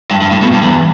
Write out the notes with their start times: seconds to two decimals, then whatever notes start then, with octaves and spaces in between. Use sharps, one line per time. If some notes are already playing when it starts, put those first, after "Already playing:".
0.11 G2
0.21 G2
0.31 A2
0.42 B2
0.53 G2
0.62 E2